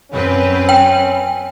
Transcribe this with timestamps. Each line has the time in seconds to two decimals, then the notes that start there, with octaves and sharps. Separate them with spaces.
0.11 F#2 C4 C#4 B4
0.69 G5